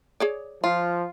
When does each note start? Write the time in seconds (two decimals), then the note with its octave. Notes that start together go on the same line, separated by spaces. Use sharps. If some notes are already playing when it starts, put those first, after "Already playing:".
0.20 G#4 C#5 D5
0.64 F3 F4